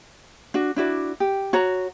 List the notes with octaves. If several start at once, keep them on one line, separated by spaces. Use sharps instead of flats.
D4 F#4
D4 E4 F#4 D5
G4
F#4 C#5 F#5 A#5